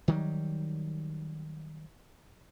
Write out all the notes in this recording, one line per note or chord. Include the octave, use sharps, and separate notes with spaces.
D#3 F#3 G3